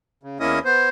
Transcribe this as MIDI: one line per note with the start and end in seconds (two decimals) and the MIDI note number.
0.23 0.38 49
0.40 0.59 40
0.40 0.59 58
0.40 0.59 61
0.40 0.59 64
0.40 0.59 75
0.40 0.59 87
0.65 0.89 59
0.65 0.89 72